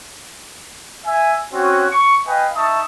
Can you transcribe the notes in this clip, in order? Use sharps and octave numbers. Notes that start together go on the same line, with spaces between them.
E5 G#5
C4 C#4 F#4
C#6
B4 D#5 F5 G5 G#5
D#4 E5 A5 C#6 D#6